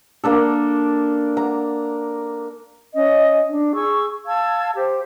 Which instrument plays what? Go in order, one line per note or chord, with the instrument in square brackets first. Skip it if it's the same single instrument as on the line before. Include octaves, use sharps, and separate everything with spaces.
[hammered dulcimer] A#3 D4 A4
A#5
[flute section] C#4 D#5
D4
G#4 C#6 E6
F5 A5 E6 G#6
G4 C5